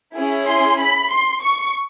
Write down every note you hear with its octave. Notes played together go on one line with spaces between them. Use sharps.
C#4 E4 G#4
C6
B5
C6
C#6